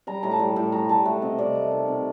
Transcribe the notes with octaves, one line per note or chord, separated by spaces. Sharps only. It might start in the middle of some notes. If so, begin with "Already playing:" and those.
G3 A#5
A2 A#5
A5
G3
A2 G5
G3 A#5
G3 A5
A3 F#5
C3 D#5
C3 D5
A3
D#3
C3